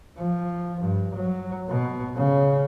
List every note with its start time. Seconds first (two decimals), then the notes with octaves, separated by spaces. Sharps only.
0.17 F3
0.81 G2
1.14 F#3
1.69 B2
2.15 C#3